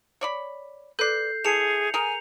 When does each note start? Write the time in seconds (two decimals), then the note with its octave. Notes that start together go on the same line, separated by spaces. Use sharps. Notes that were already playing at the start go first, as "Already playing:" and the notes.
0.21 C#5 D5 B5
0.99 A4 B4 D5 F#6 G6 C7
1.44 E3 G#4 A5 C#7 F7
1.94 G#4 A#4 G#5 F7